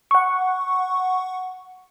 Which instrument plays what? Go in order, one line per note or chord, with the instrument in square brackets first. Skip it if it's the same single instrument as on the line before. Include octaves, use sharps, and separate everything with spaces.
[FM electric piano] F#5 C#6